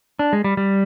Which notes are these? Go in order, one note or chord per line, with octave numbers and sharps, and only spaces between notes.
D4
G#3
G3
G3